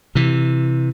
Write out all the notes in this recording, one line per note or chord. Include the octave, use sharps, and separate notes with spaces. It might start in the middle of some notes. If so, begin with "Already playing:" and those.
C3 E3